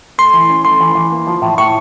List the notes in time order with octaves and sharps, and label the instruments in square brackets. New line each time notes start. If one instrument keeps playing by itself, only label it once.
[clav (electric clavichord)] A3 [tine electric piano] C6
[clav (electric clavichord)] E3
C#4
[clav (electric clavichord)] A3 [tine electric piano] C6
[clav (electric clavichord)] E3
E3
A#3
F3
A2
[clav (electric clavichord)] A2 [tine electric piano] C#6